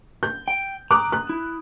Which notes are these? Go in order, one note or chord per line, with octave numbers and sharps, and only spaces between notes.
G6
G5
A#5 D6 D#6 F#6
F#6
E4